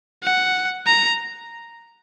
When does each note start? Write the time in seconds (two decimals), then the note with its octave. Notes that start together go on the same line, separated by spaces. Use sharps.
0.23 F#5
0.86 A#5